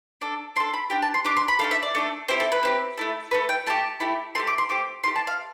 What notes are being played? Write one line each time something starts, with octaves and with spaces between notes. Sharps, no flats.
D4 A4 D6
D4 A4 C6
B5
D4 G4 G5
A5
C6
D4 G4 D6
C6
B5
A3 D4 A4 F5
E5
D5
A3 D4 A4
C4 E4 G4 C5
A4
B4
C4 E4 G4
A3 E4 A4
A3 E4 A4 B4
G5
A3 E4 G4 A5
A3 E4 G4
A3 C4 G4 C6
D6
C6
A3 C4 G4 D6
A3 E4 G4 C6
A5
F5